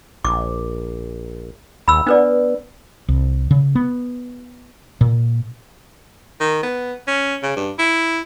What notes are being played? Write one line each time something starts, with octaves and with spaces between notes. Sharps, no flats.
A#1 D6
D#2 B5 E6
B3 D4 B4 D5
C2
C#3
B3
A#2
D#3
B3
C#4
C#3
G2
E4